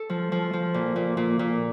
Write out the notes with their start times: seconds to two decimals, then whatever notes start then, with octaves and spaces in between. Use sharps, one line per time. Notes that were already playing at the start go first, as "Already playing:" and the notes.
Already playing: A4
0.09 F3
0.32 F3
0.53 F3
0.74 A#2
0.96 A#2
1.17 A#2
1.39 A#2